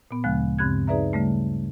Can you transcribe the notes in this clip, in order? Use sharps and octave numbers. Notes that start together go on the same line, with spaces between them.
A#2 B3
D2 C#3 F3 G#3 F5 F#6
G2 C#3 C4 F#6 G#6
D#4 G#4 B4 D5 E5 A#5
C#3 G3 A3